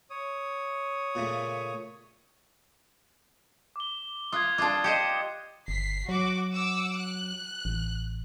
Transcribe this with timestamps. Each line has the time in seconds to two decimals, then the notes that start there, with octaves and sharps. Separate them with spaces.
0.10 C#5 D#6
1.15 A#2 C#3 A3
3.76 D6 G7
4.32 F4 D#6 F#6 G#6
4.58 D4 F4 D6 A6
4.84 G4 C5 D#5 C#7
5.68 G1 B6 C7
6.09 F#3 F#4 D6
6.51 F#5 D6 E6
6.97 F#6
7.65 A1